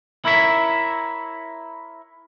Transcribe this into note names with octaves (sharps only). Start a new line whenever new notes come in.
E4 A#4 C#5 E5